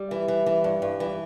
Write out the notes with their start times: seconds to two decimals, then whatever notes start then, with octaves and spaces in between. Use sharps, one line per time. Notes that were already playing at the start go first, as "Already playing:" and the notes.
Already playing: G3
0.11 E3
0.28 E3
0.46 E3
0.64 G2
0.82 G2
1.00 E3